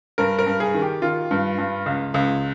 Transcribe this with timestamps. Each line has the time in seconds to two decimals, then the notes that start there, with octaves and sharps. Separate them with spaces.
0.18 G2 A#4
0.39 A#4
0.47 G2
0.60 G#4
0.74 D#3
0.82 G4
1.02 D#3 F4
1.31 G2
1.58 G2
1.86 C#2
2.14 C#2